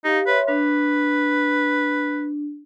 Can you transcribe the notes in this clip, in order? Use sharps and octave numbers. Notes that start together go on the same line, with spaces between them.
D#4 G4 F5
B4 C#5 E5 C6
D4 B4